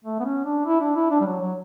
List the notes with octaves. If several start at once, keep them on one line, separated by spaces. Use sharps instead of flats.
A3
B3
C#4
D4
E4
D4
E4
D4
G3
F#3
F#3